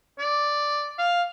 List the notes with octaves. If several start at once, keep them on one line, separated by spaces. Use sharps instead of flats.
D5
F5